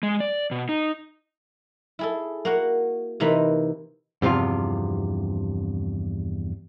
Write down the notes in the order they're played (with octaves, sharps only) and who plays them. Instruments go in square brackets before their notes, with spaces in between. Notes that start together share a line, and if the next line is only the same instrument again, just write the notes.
[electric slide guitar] G#3
D5
B2
D#4
[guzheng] E4 G#4 A4
A#3 F#4 F#5
C3 E3 A#3 D#4 B4 B5
[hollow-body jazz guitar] E2 G2 C3 F3 F4